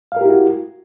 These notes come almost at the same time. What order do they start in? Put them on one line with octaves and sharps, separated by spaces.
F5 A#4 G4 E4 F#4